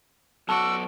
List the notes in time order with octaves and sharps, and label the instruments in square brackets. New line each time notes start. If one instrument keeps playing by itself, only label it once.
[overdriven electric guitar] B1 D5 [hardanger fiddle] F#4 [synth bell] A5 [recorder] E6